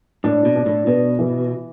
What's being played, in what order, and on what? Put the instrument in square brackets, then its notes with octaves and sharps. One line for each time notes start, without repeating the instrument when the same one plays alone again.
[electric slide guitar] A2 [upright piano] D4
[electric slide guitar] B2
[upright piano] D4
[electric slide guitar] A2
[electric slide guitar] B2 [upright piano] B3
[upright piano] E3